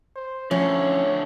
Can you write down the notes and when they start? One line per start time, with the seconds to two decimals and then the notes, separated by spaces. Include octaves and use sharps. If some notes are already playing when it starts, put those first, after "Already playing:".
0.16 C5
0.51 A2 D3 F3 C#4 C#5